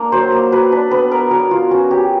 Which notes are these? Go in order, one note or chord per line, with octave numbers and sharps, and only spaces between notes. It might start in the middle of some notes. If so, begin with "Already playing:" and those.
Already playing: A#3 D4
F#3 C5
A#3
F#3 B4
D4 B4
B3 B4
B3 A#4
F#3 A#4
F#3 F4
C#4 F#4
C#4 G4